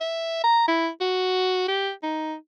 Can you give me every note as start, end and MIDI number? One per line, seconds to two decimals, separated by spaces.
0.01 0.42 76
0.44 0.65 82
0.68 0.88 64
1.01 1.66 66
1.68 1.90 67
2.03 2.34 63